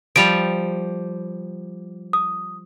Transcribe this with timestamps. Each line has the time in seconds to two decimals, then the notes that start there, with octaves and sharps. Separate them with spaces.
0.16 F3 G3 D7 F7
2.13 D#6